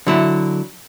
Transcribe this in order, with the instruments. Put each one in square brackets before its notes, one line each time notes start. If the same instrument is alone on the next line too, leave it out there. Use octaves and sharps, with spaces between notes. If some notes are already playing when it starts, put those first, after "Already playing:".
[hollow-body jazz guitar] D3 F#3 E4